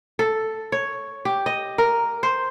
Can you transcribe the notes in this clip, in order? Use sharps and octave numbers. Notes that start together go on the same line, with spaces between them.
A4
C#5
G4
D#5
A#4
C5